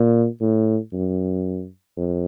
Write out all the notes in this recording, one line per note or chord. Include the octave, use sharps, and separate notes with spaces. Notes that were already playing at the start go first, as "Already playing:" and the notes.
Already playing: A#2
A2
F#2
F2